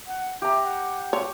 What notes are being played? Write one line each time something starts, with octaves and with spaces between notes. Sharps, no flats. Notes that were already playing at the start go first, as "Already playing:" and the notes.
F#5
G4 E5 A#5
F#5
C#5